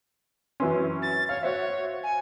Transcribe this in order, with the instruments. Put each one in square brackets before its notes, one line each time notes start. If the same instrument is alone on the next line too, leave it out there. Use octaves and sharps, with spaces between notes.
[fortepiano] F#2 E3 C#4 [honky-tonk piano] E5 C6
[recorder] A6
[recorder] C#5 [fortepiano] F5
[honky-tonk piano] F#4 C5 E5 [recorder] C#5
[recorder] G#5